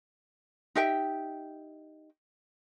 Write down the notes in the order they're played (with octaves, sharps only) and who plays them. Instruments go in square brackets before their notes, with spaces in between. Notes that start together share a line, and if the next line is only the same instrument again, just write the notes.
[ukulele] D#4 G4 E5 G5